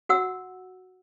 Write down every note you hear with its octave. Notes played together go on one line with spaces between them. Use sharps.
F#4 F#5 E6